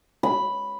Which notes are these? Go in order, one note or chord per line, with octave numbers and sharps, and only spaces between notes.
B5